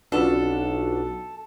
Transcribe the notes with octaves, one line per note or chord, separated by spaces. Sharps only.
B1 C#4 D4 F4 F#4 A4 B4